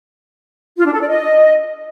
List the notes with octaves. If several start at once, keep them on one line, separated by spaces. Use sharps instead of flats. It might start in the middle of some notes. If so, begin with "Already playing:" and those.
F4
D4
A4
D5
D#5